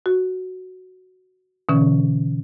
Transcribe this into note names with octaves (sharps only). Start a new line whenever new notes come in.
F#4
B2 D3 E3 C#4